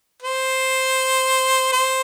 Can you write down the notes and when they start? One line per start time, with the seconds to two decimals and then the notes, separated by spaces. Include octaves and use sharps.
0.23 C5
1.73 C5